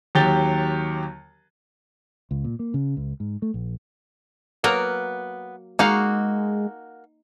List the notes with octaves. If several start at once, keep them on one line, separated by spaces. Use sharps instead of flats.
D#2 F#3 G4 A6 G7
C#2
A#2
A#3
C#3
C#2
G#2
A3
A#1
F#3 A#3 B3 A#4
G#3 A#3 D#4 F#4 F5